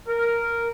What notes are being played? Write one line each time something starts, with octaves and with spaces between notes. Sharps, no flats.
A#4